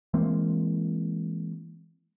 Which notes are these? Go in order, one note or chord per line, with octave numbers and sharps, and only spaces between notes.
E3 G#3 A#3 C4